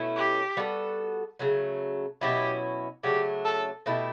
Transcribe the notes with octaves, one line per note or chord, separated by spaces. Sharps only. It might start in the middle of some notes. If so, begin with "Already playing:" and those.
Already playing: B2 A3 C#4 E4
G4
G3 B3 F#4 A4
C#3 F#3 A3
B2 F#3 C#4 E4 G4
C#3 F#3 A3 D4 G4
A4
B2 A3 E4 G4